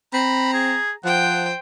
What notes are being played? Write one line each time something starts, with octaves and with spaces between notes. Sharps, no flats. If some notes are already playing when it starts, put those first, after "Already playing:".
C4 A#5 B5
G#4
F3 C5 F#5 G5